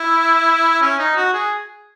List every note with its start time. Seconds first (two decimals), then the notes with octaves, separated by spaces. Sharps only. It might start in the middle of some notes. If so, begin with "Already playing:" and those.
Already playing: E4
0.82 C#4
0.99 D#4
1.16 F#4
1.34 G#4